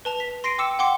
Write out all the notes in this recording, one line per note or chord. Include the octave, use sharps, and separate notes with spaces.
B4 A5 F7
B6
C6 A#6 C7 D7 D#7
G5 D6 E6 C#7 E7
F#5 G5 C6 D6 C#7